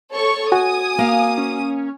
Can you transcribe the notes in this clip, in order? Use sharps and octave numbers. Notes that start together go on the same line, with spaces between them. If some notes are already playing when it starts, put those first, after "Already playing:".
A4 C#5 C#6
F#4 G#5 D#6
A#3 F5
C#4